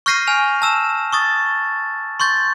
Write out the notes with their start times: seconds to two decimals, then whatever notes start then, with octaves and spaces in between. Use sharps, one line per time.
0.06 C#6 F6 G6 A#6 C7 D#7
0.27 G#5 F6 F7
0.62 A5 E6 E7
1.12 C#6 D#6 A6
2.20 C6 C#6 G6 A6